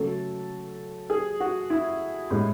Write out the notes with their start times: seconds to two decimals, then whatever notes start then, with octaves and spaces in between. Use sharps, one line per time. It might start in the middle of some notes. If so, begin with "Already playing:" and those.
Already playing: C#3 F#3 A3 A4
1.10 G#4
1.40 F#4
1.70 E4
2.30 A2 G#3